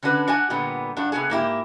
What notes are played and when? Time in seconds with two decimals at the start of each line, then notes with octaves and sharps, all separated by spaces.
0.03 D3 C#4 D4 F#4 B4
0.28 D4 F#4 F#5 G#5
0.50 A#2 D3 G3 B3
0.97 G2 D4 F#4
1.12 C3 B3 F#4 G#4
1.30 G#2 A#3 E4 G4